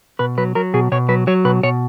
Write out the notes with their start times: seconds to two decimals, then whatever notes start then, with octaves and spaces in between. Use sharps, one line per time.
0.19 B2 B4
0.38 F#3 B4
0.55 F#3 A#4
0.74 B2 G#4
0.92 B2 C#5
1.09 F#3 B4
1.27 F#3 C#5
1.45 B2 B4
1.63 B2 C#5